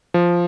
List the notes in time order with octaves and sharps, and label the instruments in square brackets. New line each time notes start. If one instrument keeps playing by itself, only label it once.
[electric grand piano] F3